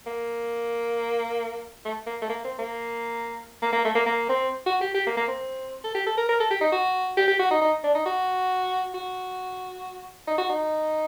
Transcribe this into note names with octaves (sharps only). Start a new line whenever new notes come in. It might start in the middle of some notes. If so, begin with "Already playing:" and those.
A#3
A3
A#3
A3
A#3
C4
A#3
A#3
A#3
A3
A#3
A#3
C4
F#4
G4
G4
A#3
A#3
C4
A4
G4
A4
A#4
A#4
A4
G4
D#4
F#4
G4
G4
F#4
D#4
D#4
D4
D#4
F#4
F#4
D#4
F#4
D#4